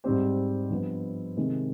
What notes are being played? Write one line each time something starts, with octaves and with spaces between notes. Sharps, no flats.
G#2 G3 C4 G4 C5
G2 F3 B3
C3 D#3 G#3